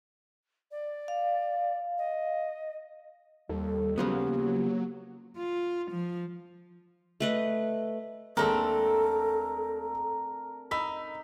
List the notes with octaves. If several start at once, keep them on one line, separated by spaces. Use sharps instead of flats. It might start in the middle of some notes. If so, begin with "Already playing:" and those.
D5
F5
D#5
D#2 G3 A4
C#3 F3 F#3 A#3 B3 G4
F4
F3
A3 B4 D#5
D#2 G#3 A3 C4 D4 A4 A#4 A#5
D#4 B5 E6 B6